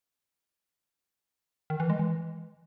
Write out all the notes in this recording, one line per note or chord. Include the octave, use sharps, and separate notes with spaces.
D#3
E3
G#3
E3